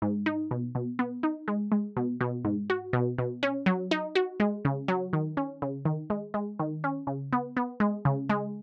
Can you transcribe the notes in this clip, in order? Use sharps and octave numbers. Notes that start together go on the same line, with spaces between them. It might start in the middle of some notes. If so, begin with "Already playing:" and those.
G#2
D#4
B2
B2
B3
D#4
G#3
G#3
B2
B2
G#2
F#4
B2
B2
C#4
F#3
D#4
F#4
G#3
C#3
F#3
D#3
C#4
C#3
D#3
G#3
G#3
D#3
C#4
C#3
B3
B3
G#3
C#3
G#3